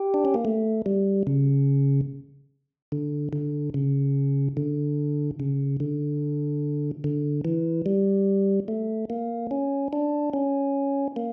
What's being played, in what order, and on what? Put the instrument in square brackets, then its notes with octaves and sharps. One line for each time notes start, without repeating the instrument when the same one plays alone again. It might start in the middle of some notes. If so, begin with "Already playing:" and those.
Already playing: [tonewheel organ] G4
D4
C#4
A#3
A3
G3
C#3
D3
D3
C#3
D3
C#3
D3
D3
E3
G3
A3
A#3
C#4
D4
C#4
A#3